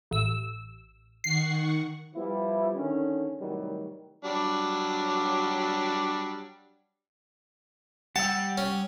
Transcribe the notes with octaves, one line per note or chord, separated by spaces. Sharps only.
A1 E6
D#3 F#5 C#6 C7
F3 G3 B3 E4
D3 D#3 C#4
C2 A2 D#3 F#3 G3
F#3 G3 D4
G3 G4 F#5 A5 E6
C#4